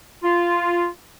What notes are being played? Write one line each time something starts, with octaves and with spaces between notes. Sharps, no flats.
F4